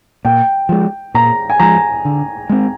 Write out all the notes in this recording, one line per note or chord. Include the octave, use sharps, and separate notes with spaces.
A#2 G5
F3 G#3
A#2 A#5
G#5
F3 G#3 A#5
D3
G#3 C4